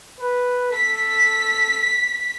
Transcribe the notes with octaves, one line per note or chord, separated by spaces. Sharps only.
B4
A4 B6